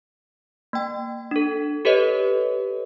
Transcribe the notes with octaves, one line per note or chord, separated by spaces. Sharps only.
A#3 G5
D4 A4
G4 A4 B4 C#5 D#5